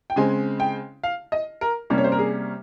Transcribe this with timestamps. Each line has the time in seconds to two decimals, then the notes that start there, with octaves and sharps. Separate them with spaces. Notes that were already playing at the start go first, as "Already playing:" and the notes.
0.10 G5
0.16 C#3 G#3 C4 G#5
0.60 G5
1.03 F5
1.32 D#5
1.61 A#4
1.90 C3 G3 A#3 C#4
1.98 C#5
2.04 C5
2.12 A#4
2.19 G#4